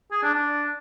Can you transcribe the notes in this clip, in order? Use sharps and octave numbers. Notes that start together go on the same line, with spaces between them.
G#4
D4
D4